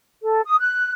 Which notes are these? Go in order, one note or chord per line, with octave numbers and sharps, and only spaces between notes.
A4
D#6
F#6